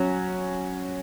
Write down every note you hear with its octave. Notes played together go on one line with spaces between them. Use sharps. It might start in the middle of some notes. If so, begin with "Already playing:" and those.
Already playing: F#3 C#4 F#4